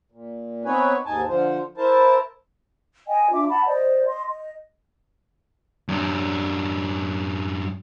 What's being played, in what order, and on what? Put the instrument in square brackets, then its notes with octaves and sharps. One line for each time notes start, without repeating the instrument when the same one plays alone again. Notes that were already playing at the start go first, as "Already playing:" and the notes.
[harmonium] A#2
B3 C4 D#4 B4 C#5 G#5
D#2 G#2 D#4 G#5 A5
D3 F3 F4 C5
E4 A#4 C5 A5
[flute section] D#5 G5 G#5
D4 F4 E5 D6
F#5 A5 B5
C5 D5 D#5
D#5 C6
D#5
[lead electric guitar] F#2 D4